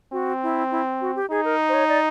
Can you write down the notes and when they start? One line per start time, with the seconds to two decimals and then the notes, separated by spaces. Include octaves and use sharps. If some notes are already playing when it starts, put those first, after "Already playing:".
0.12 C4 F#4
0.43 E4
0.71 E4
1.01 F#4
1.16 G4
1.31 D#4 G#4
1.45 A#4
1.69 C5
1.74 C#5
1.89 D5